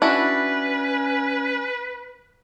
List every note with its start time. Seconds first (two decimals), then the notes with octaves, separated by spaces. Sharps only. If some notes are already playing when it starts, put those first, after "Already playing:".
0.02 C#4 D4 E4 F#4 B4